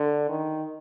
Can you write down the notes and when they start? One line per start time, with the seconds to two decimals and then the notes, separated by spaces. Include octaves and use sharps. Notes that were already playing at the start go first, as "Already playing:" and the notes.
Already playing: D3
0.29 D#3